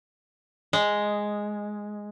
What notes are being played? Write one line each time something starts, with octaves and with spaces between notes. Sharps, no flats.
G#3